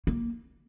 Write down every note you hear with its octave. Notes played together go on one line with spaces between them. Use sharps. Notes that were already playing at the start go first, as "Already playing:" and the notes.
A#3